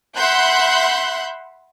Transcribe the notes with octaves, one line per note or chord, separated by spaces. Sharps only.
E5 F#5 B5 C6 F#6 G6